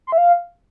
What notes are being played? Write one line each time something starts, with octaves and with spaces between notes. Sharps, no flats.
C6
E5
F5